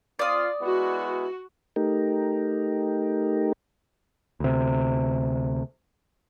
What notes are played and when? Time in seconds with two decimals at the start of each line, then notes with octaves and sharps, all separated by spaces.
0.19 C4 F4 D5 D#6
0.62 G#3 B3 E4 F#4
1.76 A3 D#4 G4 A#4
4.40 D2 C3